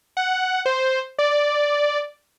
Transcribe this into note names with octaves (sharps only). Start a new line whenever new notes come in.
F#5
C5
D5